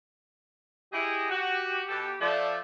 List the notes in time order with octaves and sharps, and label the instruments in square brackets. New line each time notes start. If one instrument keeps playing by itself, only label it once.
[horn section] E4 G#4 D#5 [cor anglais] G4
[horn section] F#4
B2 A4
[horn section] F3 A3 [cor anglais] D5